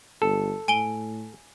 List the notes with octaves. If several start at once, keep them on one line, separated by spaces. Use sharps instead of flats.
G1 A4
A2 G#5 D7 G7